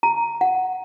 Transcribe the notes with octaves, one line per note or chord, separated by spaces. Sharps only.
A#5
F#5